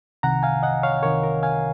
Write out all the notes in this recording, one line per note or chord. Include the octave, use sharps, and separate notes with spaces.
C2 C3 D#3 F#5 A#5
F5 G#5
D#5 F#5
C#5 F5
C2 C3 D#3 A#4 C#5
A#4
F5 G#5